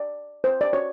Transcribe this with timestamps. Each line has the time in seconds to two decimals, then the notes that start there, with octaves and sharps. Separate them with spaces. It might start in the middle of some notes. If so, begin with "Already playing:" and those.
Already playing: D5
0.44 C5
0.61 D5
0.73 C#5